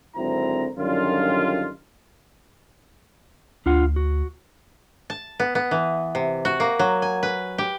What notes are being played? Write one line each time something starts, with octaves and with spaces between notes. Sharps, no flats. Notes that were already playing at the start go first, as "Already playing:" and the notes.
G#1 D3 F#3 C4 E4 A#5
F#2 D3 D#3 G3 D4 F4
D2 D4 F4 F#5
F#4
A5
B3
B3
E3
C3
F#4
A#3
F#3
G#5
B4
G4